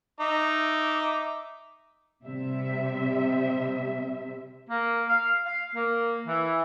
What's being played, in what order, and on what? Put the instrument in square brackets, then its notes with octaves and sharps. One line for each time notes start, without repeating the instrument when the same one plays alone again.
[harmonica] D#4 E5 D6
[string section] C3 G3 E5
[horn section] A#3
F5
F5
A#3
E3